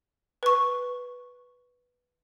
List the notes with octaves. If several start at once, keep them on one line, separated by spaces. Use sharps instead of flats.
B4 C#6